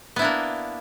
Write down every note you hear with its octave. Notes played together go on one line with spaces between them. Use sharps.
A#3 B3 D4 E4